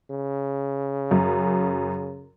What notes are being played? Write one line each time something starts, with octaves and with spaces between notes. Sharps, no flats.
C#3
F#2